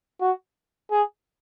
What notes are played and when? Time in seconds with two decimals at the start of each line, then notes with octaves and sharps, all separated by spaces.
0.21 F#4
0.91 G#4